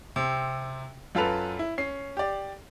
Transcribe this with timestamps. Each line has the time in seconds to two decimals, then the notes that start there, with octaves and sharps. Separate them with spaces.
0.16 C3 C4
1.15 F#2 F4 A4 B4 F7
1.59 E4
1.78 C#4 C7
2.17 G4 D5